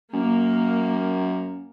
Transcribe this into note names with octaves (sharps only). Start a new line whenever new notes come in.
F#2 A#3